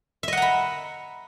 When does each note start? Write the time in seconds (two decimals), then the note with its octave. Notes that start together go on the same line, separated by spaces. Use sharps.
0.23 E5
0.28 D#5
0.33 F#5
0.37 A#5
0.42 B5